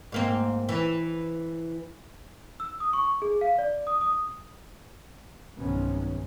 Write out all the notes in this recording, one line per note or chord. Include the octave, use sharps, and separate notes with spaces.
G#2 A#3 C4
E3
E6
D#6
C#6
G#4
F5
D5
D#6
D#6
B1 G2 C3 D#3 B3 C#4